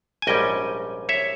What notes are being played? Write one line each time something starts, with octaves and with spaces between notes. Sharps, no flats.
G#5
A#1 G#2 G3 C#4 D#5 G5
C#5 E5